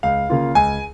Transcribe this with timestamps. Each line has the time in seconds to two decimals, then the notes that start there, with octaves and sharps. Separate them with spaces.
0.03 C#2 F5
0.30 C#3 A#3 F4
0.55 C#2 G#5